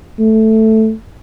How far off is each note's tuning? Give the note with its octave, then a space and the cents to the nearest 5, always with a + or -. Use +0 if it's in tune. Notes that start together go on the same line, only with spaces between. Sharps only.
A3 +0